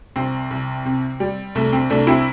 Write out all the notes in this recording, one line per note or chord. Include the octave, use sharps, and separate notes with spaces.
C2 C4
C2
C3
G3
C2 A3
C4
C2 A3 D4
C4 E4